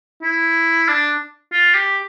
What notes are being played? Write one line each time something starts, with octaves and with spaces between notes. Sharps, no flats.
E4
D4
F4
G4